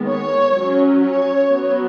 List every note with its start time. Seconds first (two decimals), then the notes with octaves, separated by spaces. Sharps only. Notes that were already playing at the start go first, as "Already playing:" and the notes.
Already playing: D#3 G#3 B3
0.08 C#5
0.55 F#3 C#4
1.04 C#5
1.50 F#3 B3